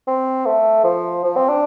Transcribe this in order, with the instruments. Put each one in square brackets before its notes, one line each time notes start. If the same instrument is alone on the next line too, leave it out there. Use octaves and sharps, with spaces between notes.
[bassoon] C4
A3
F3
F3
C4
D4